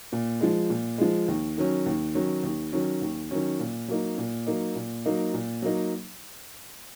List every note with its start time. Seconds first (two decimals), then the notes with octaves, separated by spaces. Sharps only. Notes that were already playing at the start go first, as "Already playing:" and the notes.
0.12 A#2
0.41 F3 G#3
0.70 A#2
0.98 F3 G#3
1.28 D#2
1.57 D#3 F#3 C#4
1.86 D#2
2.15 D#3 F#3 C#4
2.43 D#2
2.72 D#3 F#3 C#4
3.02 D#2
3.31 D#3 F#3 C#4
3.60 A#2
3.88 F#3 A#3 D#4
4.18 A#2
4.46 F#3 A#3 D#4
4.75 A#2
5.05 F#3 A#3 D#4
5.33 A#2
5.62 F#3 A#3 D#4